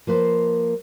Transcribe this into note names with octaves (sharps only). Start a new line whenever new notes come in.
F3 A#3 B4 C5